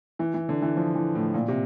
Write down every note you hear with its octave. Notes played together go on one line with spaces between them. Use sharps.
E3
E3
D3
E3
F3
E3
A2
A#2
C3